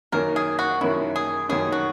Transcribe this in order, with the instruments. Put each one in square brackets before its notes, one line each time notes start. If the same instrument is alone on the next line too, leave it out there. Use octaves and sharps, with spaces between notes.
[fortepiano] F#2 D#3 A#3 C#4 [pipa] A#4
[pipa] G#4
F#4
[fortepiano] F#2 D#3 A#3 C#4 [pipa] E4
[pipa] G#4
[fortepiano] F#2 D#3 A#3 C#4 [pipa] G#4
[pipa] F#4